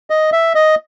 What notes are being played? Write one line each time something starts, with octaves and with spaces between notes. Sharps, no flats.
D#5
E5
D#5